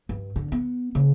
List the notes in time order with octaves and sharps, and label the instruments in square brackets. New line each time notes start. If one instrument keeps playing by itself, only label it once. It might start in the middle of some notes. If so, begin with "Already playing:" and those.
[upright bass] G2
D3
B3
C#3 A#3